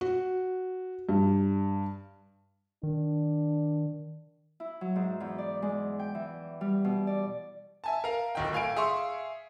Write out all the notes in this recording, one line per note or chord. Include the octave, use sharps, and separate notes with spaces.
F#4
G2
D#3 D4
E4
F#3
G#2
E2
D5
G#3
G5
E3
G3
B2
D5
E5 G#5 A5
A#4 F5
D1 D#3 G5
A2 F5 G#5 D7
G#4 E5 F5 C6 C#6